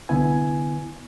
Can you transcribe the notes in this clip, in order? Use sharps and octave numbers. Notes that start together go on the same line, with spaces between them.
C2 D3 B3 E4 G#5